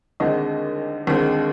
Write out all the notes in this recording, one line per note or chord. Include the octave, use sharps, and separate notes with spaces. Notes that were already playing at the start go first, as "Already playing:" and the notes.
D#2 D3 G#3 C4 D#5
D#2 D3 G#3 C4